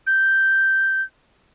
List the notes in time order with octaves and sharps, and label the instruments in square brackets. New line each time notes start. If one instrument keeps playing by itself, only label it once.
[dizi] G6